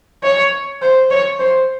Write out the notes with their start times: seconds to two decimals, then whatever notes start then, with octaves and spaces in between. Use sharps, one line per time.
0.23 C#5
0.82 C5
1.11 C#5
1.40 C5